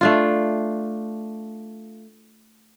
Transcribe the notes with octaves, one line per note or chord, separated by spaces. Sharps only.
A3 D4 F4